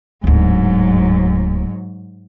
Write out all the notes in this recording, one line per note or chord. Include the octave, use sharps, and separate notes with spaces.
D1 D2 G#2 F#3